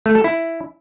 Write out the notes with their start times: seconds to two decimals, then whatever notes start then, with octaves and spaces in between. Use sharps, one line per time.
0.06 A3
0.15 A4
0.24 E4